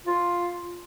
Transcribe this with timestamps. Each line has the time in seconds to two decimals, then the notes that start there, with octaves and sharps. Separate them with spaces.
0.07 F4